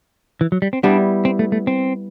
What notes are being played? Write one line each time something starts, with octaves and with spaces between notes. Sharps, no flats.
E3
F#3
G3
C4
G3 B3 D4 E4
C4
A3
A3
C4